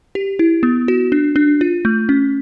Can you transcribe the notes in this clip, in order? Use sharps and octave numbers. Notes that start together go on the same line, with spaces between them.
G4
E4
B3
F#4
D4
D4
F4
A3
C#4